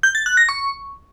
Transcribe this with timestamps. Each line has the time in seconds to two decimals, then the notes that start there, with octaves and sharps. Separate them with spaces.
0.03 G6
0.15 A6
0.26 F#6
0.37 A#6
0.49 C#6